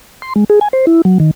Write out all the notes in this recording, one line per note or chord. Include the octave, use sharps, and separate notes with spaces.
C6
G#3
G#4
G#5
C5
E4
F#3
D#3